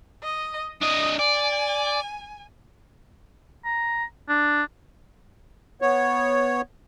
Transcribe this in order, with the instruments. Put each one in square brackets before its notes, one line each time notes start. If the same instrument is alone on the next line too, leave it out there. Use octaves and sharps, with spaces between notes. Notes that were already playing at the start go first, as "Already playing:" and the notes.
[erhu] D#5
[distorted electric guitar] D4 D#5 [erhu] D#6
[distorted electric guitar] D5 [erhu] G#5
[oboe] A#5
D4
[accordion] B3 C#5